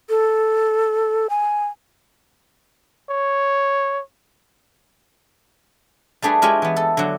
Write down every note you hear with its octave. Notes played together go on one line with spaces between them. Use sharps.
A4
G#5
C#5
G3 A3 D4 G#4 B4
G#3 E4 F4 G4 C#5 G#5
E3 B3
A4
D3 F#3